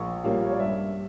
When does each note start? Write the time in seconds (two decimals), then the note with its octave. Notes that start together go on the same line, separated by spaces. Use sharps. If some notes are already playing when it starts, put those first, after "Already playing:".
Already playing: A#1 C#6
0.24 A#2 G3 A#3 C#4 F5
0.45 C#5
0.52 D5
0.60 G2 E5